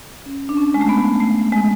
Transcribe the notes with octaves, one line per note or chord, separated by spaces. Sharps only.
C#4
D4
C#4
G#3
A3
B3
A3
G#3